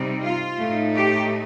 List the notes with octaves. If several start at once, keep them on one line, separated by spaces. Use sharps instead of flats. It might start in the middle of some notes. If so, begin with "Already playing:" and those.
Already playing: C3 G3 C4 D#4
F4
A2 A3 D#4
G4